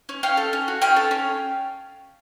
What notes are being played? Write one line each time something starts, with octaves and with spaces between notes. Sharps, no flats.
C#4
C#4 F5 G5
A4
C#4
F#4
C#4 F5 G5
A4
C#4